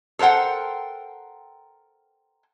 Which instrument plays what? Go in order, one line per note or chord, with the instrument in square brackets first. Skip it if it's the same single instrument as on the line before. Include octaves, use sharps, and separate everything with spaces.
[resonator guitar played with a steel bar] A4 A#4 C5 F#5 G5